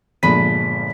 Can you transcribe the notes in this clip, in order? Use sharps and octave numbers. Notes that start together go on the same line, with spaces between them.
G1 A#2 F3 G#3 B5 B6 D#7